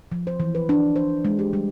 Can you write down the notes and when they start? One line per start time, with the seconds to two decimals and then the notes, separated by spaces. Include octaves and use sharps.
0.12 F3
0.27 C5
0.40 E3
0.55 B4
0.69 D4
0.96 C5
1.25 G#3
1.39 G4
1.53 G3